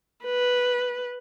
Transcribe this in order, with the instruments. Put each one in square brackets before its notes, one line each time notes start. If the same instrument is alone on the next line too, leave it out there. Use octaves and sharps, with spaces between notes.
[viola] B4